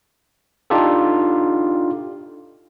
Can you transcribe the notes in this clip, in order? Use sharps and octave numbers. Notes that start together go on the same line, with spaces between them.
D4 D#4 F4 G4 A4